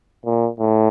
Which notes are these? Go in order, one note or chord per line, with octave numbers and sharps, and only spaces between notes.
A#2
A2